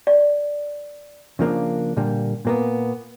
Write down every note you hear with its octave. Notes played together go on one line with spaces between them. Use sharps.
D5
C#3 F3 A#3 D4
A#2 D3 G3 A#3
A#2 A#3 B3